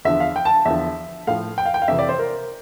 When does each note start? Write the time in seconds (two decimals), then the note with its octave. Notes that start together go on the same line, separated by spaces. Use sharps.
0.05 E2 D3 F3 E5
0.20 F5
0.36 G5
0.45 A5
0.65 E2 D3 F3 E5
1.27 A2 F3 F5
1.58 G5
1.66 F5
1.74 G5
1.82 F5
1.88 F2 C3 E3 E5
1.99 D5
2.09 C5
2.19 A#4